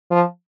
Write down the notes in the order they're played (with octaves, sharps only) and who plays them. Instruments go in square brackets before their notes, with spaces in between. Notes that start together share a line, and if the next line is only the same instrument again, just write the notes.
[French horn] F3